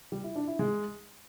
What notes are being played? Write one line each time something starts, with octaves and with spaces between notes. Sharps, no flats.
G3
E4
D4
E4
G#3